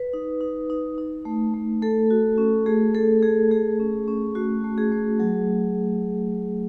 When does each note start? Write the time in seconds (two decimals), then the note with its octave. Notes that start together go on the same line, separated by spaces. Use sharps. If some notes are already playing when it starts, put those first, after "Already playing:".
Already playing: B4
0.13 D#4
0.41 D#4
0.70 D#4
0.98 D#4
1.25 A3
1.54 A3
1.82 A3 A4
2.10 F#4
2.38 C#4
2.66 A3 G#4
2.94 A3 A4
3.22 A3 G#4
3.51 A3 G#4
3.80 C#4
4.08 C#4
4.35 A3 F#4
4.64 A3
4.78 G#4
4.92 A3
5.19 F#3 G#4